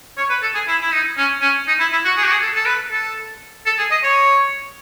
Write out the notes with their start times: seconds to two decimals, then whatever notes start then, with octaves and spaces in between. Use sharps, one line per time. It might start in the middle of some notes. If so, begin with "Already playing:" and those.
0.18 C#5
0.29 B4
0.42 A4
0.54 G#4
0.68 E4
0.81 E4
0.92 D#4
1.17 C#4
1.41 C#4
1.67 D#4
1.79 E4
1.92 E4
2.05 F#4
2.17 G#4
2.24 F#4
2.31 G#4
2.41 A4
2.54 A4
2.66 B4
2.91 A4
3.66 A4
3.78 G#4
3.91 D#5
4.03 C#5